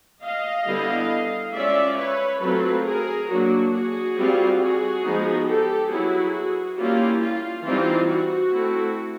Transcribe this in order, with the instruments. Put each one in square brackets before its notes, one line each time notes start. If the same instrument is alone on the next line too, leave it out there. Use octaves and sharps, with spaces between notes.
[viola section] D#5 F5
D3 G3 B3 E4
G#3 C#4 F4 D5 E5
B4 C#5
F#3 A3 C4 F4 A4 B4
G#4 A#4
F#3 A#3 D4 F#4
F#4 G#4
G3 C4 F4
F#4 G#4
F3 G#3 B3 D#4
G4 A4
F#3 B3 E4 F#4 G#4
G3 A#3 C#4 E4 F4 G4
F4
E3 G3 C4 D#4 F4
F#4
A3 C4 E4